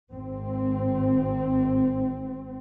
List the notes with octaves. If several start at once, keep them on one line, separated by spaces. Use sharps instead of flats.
G#1 C4